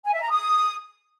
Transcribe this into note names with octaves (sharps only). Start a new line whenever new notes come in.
G#5
E5
A#5
D#6